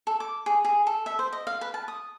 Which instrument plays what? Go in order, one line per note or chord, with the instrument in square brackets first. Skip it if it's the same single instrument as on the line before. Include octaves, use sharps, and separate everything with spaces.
[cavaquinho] A4
D6
G#4
G#4
A4
E5
C5
D#5
F5
B4
A5
D#6